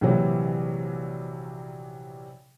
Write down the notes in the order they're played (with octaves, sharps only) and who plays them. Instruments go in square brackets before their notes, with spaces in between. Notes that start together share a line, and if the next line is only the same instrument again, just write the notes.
[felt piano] A#1 C3 E3 F#3